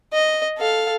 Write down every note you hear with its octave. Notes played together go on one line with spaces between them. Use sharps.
D#5
A4 F5